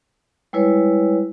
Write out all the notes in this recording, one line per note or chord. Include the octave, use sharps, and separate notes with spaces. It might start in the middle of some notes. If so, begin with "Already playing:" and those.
G3 G#3 E4 B4 C#5